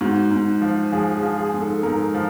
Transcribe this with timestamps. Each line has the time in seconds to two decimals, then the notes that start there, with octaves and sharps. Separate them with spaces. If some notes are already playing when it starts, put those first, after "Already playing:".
0.01 G#2 F#4
0.31 G#2
0.61 F3
0.92 F3 G#4
1.15 G#4
1.23 F3
1.38 G#4
1.54 G#2
1.61 A4
1.83 G#2 A#4
2.14 F3